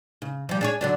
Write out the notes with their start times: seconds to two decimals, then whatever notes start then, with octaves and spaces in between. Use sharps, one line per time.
0.22 C#3
0.49 F3 G3
0.61 D4 G#4 C#5
0.81 D3 F#3 D4